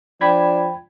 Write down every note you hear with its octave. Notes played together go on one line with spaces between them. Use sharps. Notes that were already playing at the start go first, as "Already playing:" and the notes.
F3 D4 G5 B5 G#6